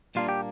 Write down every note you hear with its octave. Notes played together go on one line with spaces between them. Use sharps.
A#2 G3 A#3 D4 F4
G4